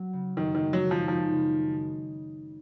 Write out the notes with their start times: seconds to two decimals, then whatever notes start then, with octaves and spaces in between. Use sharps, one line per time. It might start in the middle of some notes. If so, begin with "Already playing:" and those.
Already playing: F#3
0.13 C#3
0.37 F#2 D#3
0.55 D#3
0.60 G#3
0.73 F#3
0.85 D#3
0.91 F3
1.08 F3 D#4
1.32 C#3